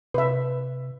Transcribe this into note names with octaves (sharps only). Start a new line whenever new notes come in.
C3 B4 E5